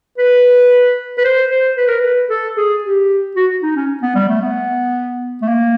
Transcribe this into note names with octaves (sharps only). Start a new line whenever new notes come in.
B4
B4
C5
C5
B4
A#4
B4
A4
G#4
G4
F#4
D#4
C#4
B3
G3
A3
B3
A3
A#3